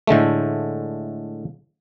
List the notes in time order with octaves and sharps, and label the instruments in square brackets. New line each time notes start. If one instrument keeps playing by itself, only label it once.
[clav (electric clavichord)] A2 D3 G#3 A3